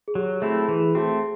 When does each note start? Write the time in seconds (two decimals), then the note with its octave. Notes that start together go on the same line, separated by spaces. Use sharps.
0.08 G#4
0.15 F#3 G4
0.42 A3 C4 E4 G#4
0.69 E3 G#4
0.95 A3 C4 F#4